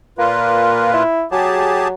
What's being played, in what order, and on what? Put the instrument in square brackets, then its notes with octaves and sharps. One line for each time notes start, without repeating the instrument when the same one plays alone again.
[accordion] A#2 F4 B4 [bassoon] A#3
[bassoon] E4
[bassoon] F#3 [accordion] G4 G#4 A5